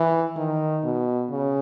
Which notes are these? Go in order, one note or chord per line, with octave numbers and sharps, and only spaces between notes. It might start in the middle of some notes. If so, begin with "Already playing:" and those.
Already playing: E3
D#3
B2
C#3